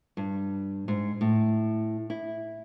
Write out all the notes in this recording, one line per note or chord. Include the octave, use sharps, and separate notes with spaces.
G2
G#2
A2
E4